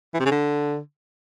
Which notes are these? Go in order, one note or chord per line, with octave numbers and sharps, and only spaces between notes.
E3
C3
C#3
D3